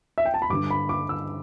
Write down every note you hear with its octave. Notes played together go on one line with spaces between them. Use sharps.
E5
G5
A5
B5
G2 D3 G3 D6
B5
D6
E6